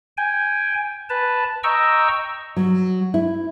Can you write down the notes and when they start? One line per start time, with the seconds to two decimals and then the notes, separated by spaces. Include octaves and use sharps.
0.17 G5 G#5
1.10 B4 A5
1.64 D#5 G5 A#5 C#6 E6
2.56 F#3
3.14 E4